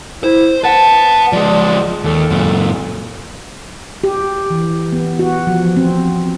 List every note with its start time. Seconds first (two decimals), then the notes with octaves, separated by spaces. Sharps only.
0.24 E4 C5
0.64 B4 F#5 A5
1.33 F3 G#3 D5
2.04 D#2 A4
2.30 F#2 A#2
4.04 G4
4.50 E3
4.92 B3
5.19 F#4
5.47 F3
5.77 C4